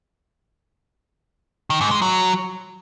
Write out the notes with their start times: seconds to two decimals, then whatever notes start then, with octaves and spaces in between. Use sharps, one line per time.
1.70 D#3
1.81 G#2
1.91 G#3
2.02 F#3